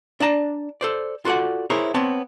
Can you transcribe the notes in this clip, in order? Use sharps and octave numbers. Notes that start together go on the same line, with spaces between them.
D4 D5 A5 A#5
A4 C5 D5
F4 F#4 A4 D5 F#5
E4 G#4 A#4 C5 C#5
B3 C4 C#5 A5